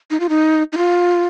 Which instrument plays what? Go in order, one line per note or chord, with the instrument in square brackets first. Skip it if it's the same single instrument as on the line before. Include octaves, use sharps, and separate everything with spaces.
[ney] D#4
F4
D#4
D#4
F4